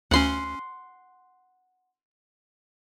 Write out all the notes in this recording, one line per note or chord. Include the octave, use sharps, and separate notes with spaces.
D2 C#4 F#5 C6